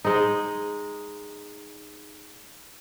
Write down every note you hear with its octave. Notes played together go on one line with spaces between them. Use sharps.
G#3 D#4